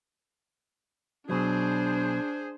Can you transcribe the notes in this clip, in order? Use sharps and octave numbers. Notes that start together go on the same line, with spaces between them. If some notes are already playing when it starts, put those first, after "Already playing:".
B1 B2 F#3 D4 G#4 C5